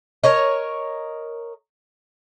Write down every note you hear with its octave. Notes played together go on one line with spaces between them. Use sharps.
A#4 C#5 D#5